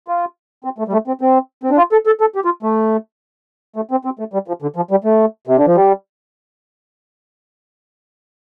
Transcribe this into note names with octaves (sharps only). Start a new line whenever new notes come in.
F4
C4
A3
G3
A3
C4
C4
C4
D4
F4
A4
A4
A4
G4
F4
A3
A3
C4
C4
A3
G3
F3
D3
F3
G3
A3
C3
D3
F3
G3